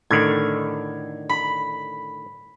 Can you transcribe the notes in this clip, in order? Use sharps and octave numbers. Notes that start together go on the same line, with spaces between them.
A2 D3 D#3 G#6
B5